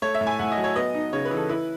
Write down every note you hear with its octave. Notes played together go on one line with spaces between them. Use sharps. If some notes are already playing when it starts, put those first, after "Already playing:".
A3 C#5
E5
A2
G#5
A2 F#5
D#5
F#3
C#5
B3 D#5
D#4
C#3 C#5
B4
E3
A4
E4 B4